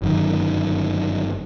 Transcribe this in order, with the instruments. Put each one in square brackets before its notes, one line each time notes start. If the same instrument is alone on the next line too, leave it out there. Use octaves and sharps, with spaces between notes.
[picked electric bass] G1 F#2 D#3